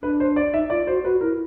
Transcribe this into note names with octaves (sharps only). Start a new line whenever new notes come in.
D4 B4
C5
D5
D#4 E5
F4 D5
F#4 C5
F#4 B4
E4 A#4